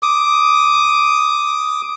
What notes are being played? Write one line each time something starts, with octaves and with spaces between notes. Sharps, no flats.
D6 D#6